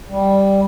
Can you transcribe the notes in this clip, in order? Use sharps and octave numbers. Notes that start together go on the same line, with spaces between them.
G3